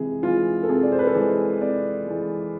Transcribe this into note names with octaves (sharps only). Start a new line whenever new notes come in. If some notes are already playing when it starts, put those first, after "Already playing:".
Already playing: C3 E3 G#3 G#4
E3 G#3 F4
A4
C3 G#4
D5
C5
B4
A4
E3 G#3 G#4
C3 D5
E3 G#3